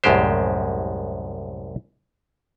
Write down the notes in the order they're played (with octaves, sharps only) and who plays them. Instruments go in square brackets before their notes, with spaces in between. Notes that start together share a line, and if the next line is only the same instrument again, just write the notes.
[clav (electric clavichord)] C2 F#2 A2 G#3 G4 C5